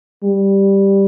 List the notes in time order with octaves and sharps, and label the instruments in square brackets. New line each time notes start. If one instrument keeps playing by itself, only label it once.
[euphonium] G3